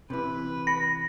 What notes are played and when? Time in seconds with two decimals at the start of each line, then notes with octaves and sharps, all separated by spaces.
0.10 C3 E3 B4
0.67 B5 A#6